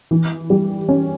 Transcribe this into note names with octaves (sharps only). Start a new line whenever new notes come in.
E3
G3
C#4